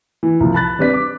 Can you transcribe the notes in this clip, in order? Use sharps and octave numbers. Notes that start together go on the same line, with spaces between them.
E3
C2 F3
A5 B5 F#6 A6
G3 C4 D4 B4 B6
D6